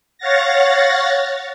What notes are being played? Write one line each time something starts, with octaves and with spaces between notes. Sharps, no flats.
C#5 F5 F#5 A6 A#6